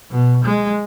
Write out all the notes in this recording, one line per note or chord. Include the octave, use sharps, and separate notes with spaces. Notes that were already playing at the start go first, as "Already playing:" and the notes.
B2
G#3